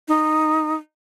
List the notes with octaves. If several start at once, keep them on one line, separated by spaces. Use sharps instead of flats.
D#4